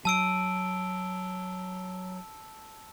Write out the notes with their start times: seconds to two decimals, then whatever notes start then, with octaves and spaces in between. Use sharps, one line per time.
0.05 F#3 A5 E6 D7